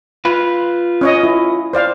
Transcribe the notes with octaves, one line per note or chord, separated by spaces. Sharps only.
F4 B4
C#4 C#5 D#5
E4
C5 D5 F5